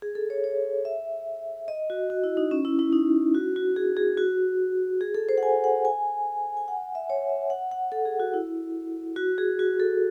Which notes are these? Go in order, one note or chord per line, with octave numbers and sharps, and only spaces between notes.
G#4
A4
C#5
C#5
E5
D#5
F#4
F#4
E4
D#4
C#4
E4
E4
D#4
F#4
F#4
G#4
G#4
F#4
G#4
A4
C5
F#5
G#5
F#5
G#5
G#5
F#5
E5
C#5
E5
F#5
F#5
A4
G#4
F#4
E4
F#4
G#4
F#4
A4